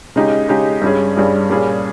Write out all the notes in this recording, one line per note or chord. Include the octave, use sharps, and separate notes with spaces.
C#3 G#3 D#4 G4
C#3 G#3 D#4 G4
G2 G3 C#4 G#4
G2 G3 C#4 G#4
A#2 G3 C#4 G#4